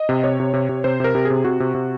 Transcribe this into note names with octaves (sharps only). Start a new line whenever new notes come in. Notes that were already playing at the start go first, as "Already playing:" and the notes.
Already playing: D#5
C3
C3 C#5
C3
C3
C3
C3 C5
C3 A#4
C3
G#4
C3
C3 F#4
C3
C3